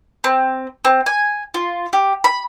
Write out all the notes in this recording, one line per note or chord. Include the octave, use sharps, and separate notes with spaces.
C4
C4
G#5
F4
G4
B5